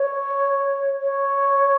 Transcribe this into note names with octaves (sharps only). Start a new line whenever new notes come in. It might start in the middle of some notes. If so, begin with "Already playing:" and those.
Already playing: C#5
C#5